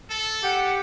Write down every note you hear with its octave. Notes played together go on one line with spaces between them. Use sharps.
A4
G4 F#5